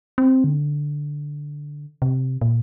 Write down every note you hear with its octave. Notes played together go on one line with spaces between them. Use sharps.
C4
D3
C3
A#2